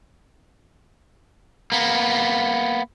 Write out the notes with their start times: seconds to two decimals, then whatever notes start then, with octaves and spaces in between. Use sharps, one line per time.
1.72 A#3 B3